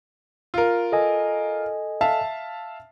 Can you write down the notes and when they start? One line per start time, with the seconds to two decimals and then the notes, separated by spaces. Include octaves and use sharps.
0.54 F4 A#4
0.92 A4 D#5 G#5
2.01 E5 F5 A5